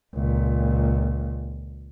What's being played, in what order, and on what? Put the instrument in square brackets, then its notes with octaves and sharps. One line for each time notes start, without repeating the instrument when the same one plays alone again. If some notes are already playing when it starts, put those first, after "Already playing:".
[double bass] C#2 A#2